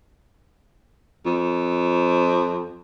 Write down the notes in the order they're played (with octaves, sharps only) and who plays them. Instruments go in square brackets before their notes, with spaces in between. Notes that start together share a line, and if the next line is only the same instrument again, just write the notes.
[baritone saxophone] F2